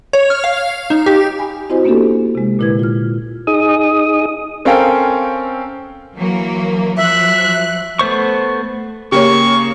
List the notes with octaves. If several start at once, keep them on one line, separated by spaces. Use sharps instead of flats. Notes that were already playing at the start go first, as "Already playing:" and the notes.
C#5
F6
F5
D#4
G4
G#5 B5
C4 E4 F#4 C5 D#5 G#5
A#3 B3 C#4 D4 G4 A4
C3 G#3
A#2 D3 E4 B4 G#6
F4 F6
D#4 G#4 D#6
C4 C#4 A4 A#4 F5 G5
E3 F#3 A#3
F3 F#3 E5 F#6
A3 B3 C5 C#6
C#3 A#3 G4 C#5 C#6